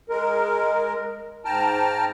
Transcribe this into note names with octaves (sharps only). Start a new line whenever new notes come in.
G#3 A#4
G#2 G5 A5 A#5 F6